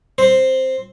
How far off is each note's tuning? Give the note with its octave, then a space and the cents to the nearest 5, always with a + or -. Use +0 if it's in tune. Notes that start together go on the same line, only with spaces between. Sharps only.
C4 +0 C5 +0